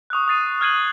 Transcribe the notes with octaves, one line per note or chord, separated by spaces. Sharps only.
C#6 D#6 F6 F#6
C#6 D#6 F6 A6 C7 D#7
F6 F#6 G#6 C7 D#7 F#7